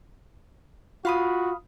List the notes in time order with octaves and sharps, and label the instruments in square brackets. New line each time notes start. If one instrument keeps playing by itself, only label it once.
[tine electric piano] F4 [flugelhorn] F#4 [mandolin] F5 B5 D#6